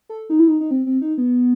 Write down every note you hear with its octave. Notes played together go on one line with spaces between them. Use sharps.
A4
D#4
E4
D#4
D#4
C4
C4
D#4
B3